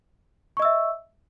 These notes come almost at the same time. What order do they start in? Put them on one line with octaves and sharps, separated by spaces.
C#6 D#5 E6 E5